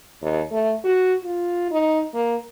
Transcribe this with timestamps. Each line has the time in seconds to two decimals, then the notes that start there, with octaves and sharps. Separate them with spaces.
0.22 D#2
0.51 A3
0.84 F#4
1.24 F4
1.71 D#4
2.14 A#3